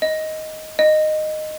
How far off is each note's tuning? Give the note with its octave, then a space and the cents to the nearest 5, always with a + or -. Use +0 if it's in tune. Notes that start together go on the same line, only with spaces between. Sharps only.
D#5 +10
D#5 -10